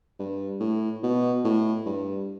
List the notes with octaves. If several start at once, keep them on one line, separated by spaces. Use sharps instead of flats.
G2
A2
B2
A2
G2